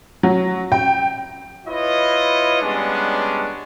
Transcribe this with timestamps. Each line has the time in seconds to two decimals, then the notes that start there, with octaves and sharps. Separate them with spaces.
0.23 F#3
0.72 G5
1.67 E4 F4 B4 C#5 D#5
2.63 G3 G#3 B3 C#4 D4